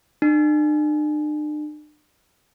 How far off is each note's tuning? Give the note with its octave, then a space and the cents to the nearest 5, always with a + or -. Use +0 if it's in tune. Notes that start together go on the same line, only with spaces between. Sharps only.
D4 +45